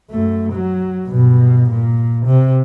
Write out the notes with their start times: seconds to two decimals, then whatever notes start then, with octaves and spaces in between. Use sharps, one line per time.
0.10 F#2 A3
0.52 F#3
1.05 G2 B2
1.70 A#2
2.26 C3